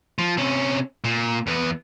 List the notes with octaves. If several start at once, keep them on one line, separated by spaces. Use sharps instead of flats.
F3
C3 C#4
A#2
E2 B3